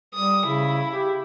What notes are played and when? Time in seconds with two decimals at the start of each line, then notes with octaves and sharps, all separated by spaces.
0.14 G3 D#6
0.45 C#3 E4
0.91 G4